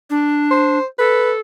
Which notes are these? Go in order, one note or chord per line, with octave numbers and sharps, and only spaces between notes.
D4
C5
A4 B4